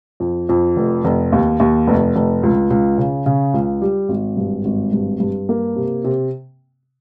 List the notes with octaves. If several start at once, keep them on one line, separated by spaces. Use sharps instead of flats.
F2
F2
F1
F1
D#2
D#2
F1
F1
C#2
C#2
C#3
C#3
C#2
G3
G#1
G2
G#1
G2
G2
A#3
C3
C3